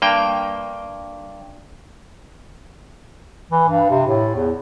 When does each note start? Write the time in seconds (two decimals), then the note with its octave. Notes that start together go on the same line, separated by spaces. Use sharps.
0.02 G2 A#3 G5
3.51 E3
3.69 G2
3.90 C3
4.07 A2
4.35 E2